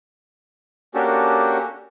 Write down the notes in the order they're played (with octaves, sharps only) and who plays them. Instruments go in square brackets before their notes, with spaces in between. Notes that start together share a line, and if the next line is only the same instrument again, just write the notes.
[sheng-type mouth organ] A#3 C#4 D4 F#4 G4 A4